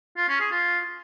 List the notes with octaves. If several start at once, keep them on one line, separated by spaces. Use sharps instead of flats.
F4
C#4
G#4
F4